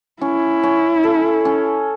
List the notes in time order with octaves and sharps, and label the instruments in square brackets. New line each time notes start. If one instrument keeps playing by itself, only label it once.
[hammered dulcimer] C#4 [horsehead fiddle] E4
[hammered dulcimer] C#4
A4
C#4